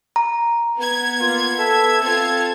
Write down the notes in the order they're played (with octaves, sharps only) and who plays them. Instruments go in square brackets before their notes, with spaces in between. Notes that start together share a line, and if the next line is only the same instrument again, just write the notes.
[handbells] A#5
[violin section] B3 G#6
[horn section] A#3 F4
A4 E5
[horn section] C4 A4 [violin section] F4 A5 G#6